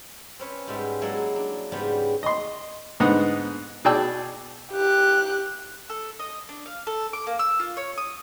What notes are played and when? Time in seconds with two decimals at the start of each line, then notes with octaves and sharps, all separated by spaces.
0.39 C4 C#4 B4 C#5
0.67 G#2 G3 G#3 B3 E5
1.01 F#3 G#3 A#3 E4 A4
1.36 D4
1.72 G#2 C#3 G3 B3
2.23 D#5 C6
3.00 G#2 D3 B3 D#4 F#5 D#6
3.85 B2 G#4 D5 G5 A5 E6
4.72 G4 F#6
5.90 A4
6.19 D#5
6.49 D4
6.66 F5
6.87 A4
7.13 D6
7.27 A#3
7.39 E6
7.60 F4
7.77 C#5
7.98 D#6